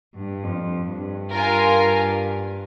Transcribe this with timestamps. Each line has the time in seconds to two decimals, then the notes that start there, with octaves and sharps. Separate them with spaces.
0.14 G2
0.44 F2
0.87 G2
1.32 F4 A#4 F5 G#5